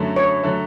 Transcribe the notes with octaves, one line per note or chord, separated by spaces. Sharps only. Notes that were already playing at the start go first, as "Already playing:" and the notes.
Already playing: F#2 D3 F#3 A3
C#5
D3 F#3 A3